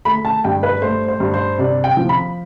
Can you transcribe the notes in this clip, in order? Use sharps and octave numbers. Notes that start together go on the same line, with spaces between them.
A3 B5
A5
G2 G5
B4
A3 C5
C5
G2
C5
C3 D5
G5
F3
B5